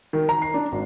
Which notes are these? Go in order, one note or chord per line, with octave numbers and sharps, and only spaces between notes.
D#3
A#5
C7
D4
G#1